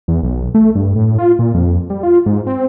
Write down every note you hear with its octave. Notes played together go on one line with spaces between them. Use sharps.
E2
B1
A3
G2
A2
F4
A#2
F2
G3
F4
G#2
C4